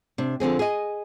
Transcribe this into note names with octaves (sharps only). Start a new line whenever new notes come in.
C3 D4
D3 F3 C4 G#4
G#4 D#5